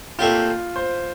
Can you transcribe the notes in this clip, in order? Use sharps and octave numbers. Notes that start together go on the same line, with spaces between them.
A#2 A3 C4 F4 G4
C5